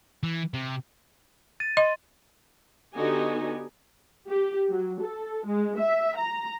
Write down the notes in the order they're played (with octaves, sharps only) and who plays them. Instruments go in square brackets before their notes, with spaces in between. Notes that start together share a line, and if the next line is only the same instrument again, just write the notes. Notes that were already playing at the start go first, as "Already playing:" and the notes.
[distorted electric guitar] E3
C3
[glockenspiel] A6 D#7
[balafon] D#5 [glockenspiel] C6
[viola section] D3 B3 D#4 F#4 G4 G#5
G4
F#3
A4
G#3
E5
A#5